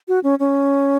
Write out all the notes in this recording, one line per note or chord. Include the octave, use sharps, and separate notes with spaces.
F#4
C#4
C#4